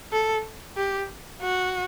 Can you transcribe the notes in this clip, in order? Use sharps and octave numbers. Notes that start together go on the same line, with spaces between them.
A4
G4
F#4